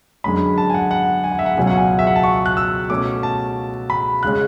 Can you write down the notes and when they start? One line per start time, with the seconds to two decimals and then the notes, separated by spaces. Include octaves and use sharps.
0.24 F#2 D3 G#3 C#4 B5
0.58 A5
0.70 G#5
0.74 F#5
0.91 F#5
1.24 G#5
1.31 F#5
1.39 E5
1.46 F#5
1.57 C#2 B2 F#3 C#4 G#5
1.67 F#5
1.77 G#5
1.90 F#5
1.99 E5
2.07 F#5
2.16 A5
2.24 C#6
2.35 C#6
2.46 F#6
2.57 E6
2.90 B2 A3 C#4 D6
3.23 A5
3.90 B5
4.23 C#3 G#3 C#4 F#6